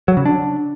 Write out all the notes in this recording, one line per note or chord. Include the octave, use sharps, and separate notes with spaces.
F#3
C#3
D4